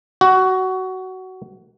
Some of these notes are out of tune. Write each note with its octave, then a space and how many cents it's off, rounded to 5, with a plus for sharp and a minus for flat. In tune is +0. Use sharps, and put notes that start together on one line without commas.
F#4 +15